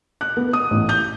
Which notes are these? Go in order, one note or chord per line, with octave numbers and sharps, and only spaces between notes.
F#6
B3
D#6
A1
G6